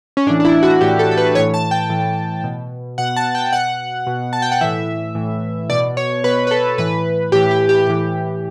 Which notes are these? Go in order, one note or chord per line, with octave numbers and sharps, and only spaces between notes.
C#4
A2 E3 D4
D4
E4
F#4
A2 E3 G4
A4
A4
B4
A2 E3 C#5
A5
G5
A2 E3
B2
B2 F#5
A5
G5
B2 F#5
B2
A5
G5
F#5
A2 E3 E5
A2 E3
B2 D5
C#5
B2 B4
B4
A4
A2 E3 B4
A2 E3 G4
G4
G4
A2 E3 G4